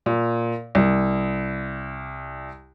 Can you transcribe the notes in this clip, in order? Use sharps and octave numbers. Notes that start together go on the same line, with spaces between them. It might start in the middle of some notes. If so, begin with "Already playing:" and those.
A#2
C2